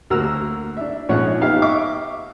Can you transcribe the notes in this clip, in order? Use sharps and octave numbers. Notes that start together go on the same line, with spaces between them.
D2 A#3 F#4 A#5 E6
D4 E5
A#1 G#2 F3 C#4 C#5 F#5
B3 D#4 G4 E5 F5
D#5 E5 C#6 D6